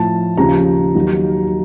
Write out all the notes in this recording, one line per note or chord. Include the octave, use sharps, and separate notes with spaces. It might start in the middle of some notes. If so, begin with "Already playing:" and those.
Already playing: A2 F3 A5
D#2 C#3 F3 A#5
D#2 D#3 F#3